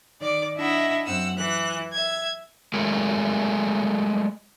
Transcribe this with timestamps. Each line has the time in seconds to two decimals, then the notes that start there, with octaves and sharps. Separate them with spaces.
0.21 D#3 D5 D6
0.57 D4 E4 D#5 E5 F#5 C#6
1.06 F#2 C4 F#5 E6
1.36 E3 F#6
1.92 E5 G#6
2.74 F#3 G#3 A3 G#4 A#4